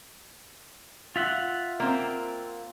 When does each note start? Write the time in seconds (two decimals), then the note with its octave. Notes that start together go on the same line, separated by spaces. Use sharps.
1.16 F4 E5 F#5
1.80 A#3 C4